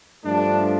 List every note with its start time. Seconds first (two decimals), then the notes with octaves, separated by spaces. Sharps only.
0.25 G2 F3 A3 D4